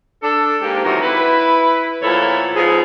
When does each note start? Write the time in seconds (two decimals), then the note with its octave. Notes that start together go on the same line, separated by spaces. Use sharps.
0.23 D4 A4
0.62 G#2 A#3 G4
0.85 C3 D#3 E3 F#3 F#4 A#4
1.03 E4 B4
2.02 E2 A#2 F3 E4 A4 C#5
2.55 G#2 F3 B3 G#4